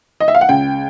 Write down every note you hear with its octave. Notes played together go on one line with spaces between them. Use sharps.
D#5
E5
F5
F#5
C#2 G5